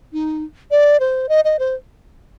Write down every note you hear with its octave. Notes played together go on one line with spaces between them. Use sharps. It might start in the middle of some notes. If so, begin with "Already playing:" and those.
D#4
D5
C5
D#5
D#5
C5